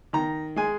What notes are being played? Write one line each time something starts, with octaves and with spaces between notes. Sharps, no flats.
D#3 A#5
G#3 G#5